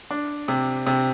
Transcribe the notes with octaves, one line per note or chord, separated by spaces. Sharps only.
D4
C3
C3